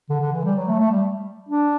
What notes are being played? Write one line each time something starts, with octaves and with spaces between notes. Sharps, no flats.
D3
D3
E3
G3
F#3
A3
A3
G3
D4